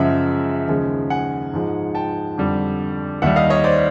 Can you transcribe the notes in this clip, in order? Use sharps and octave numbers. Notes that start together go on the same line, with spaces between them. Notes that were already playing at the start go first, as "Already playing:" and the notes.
Already playing: F#2 C#3 F3 G#3 E5 F#5
D#2 C#3 F3 G#3
F#5 G#5
G#2 F3 G#3
G5 A5
F2 D3 G3
D#2 D#3 G3 E5 F#5
D#5 F5
C#5 D#5
C5 D5